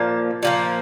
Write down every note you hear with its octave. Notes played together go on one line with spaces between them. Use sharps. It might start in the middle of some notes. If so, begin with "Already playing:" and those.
Already playing: A#2 F3 A#3 A5
A#2 F3 A#3